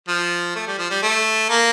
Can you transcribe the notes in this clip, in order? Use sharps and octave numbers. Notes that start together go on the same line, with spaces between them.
F3
A3
G3
F3
G3
A3
A#3